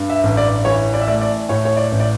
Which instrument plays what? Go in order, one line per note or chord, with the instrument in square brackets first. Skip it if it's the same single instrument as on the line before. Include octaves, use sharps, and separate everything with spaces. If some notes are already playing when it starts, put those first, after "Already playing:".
Already playing: [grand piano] G2
E5
A1
D5
E3 C#5
D5
E5
A3 D5
D5
A2 C#5
C#5
D5
A1
D5